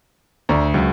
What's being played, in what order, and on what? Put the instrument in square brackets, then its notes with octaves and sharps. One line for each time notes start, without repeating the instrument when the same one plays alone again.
[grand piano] D2 [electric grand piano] D5 A#5
[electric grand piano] C#2 F#3